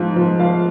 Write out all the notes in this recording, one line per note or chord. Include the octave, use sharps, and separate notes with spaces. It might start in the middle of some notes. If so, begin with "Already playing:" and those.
Already playing: G#2 F3
F3
F3 F5